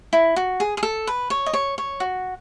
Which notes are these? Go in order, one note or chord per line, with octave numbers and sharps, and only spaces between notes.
E4
F#4
G#4
G#4
A4
B4
C#5
D#5
C#5
C#5
F#4